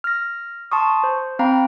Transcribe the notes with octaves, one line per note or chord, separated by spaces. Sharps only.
F6 A#6
A5 C6 C#6 D#6
C5
C4 F5 G5 A#5 B5